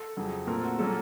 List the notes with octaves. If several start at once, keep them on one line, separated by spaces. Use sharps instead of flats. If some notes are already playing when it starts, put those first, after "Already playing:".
Already playing: A4
F2 C#3 F#3
A#2 A3 C4 A#4
F#4
A#2 F#3 A#3 C#4 A4